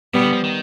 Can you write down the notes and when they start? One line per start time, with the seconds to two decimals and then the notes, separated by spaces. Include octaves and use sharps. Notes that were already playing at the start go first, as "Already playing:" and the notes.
0.14 B2 G3 B3
0.23 D3
0.33 F3
0.44 D#3